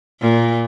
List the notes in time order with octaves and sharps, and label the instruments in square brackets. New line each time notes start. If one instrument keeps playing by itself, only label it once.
[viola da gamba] A#2